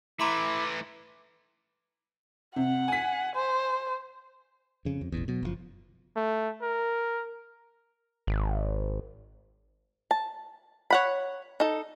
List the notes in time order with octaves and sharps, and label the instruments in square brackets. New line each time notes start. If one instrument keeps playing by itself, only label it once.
[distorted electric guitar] E3 A3 [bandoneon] E4 [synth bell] A#5 C6 F#7 [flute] D6
[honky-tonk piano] C3 [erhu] F#5
[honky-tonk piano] G#5 B6
[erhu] C5
[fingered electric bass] F2 C#3
F2
E1 A1 E2
B2 F#3
F#1 C3 F3
[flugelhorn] A3
A#4
[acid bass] G#1
[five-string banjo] A5
C#5 F#5 B5
D#4 A4